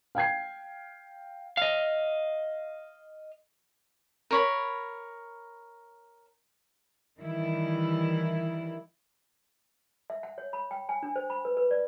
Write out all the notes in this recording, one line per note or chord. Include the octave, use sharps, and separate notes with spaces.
F5 G5 G#6 C7
D#5 F5
A#4 C#5 B5
D#3 E3 G3 E4
E5
F#5
C#5
B5
G5
G#5
D4
C5
B5
B4
B4
D5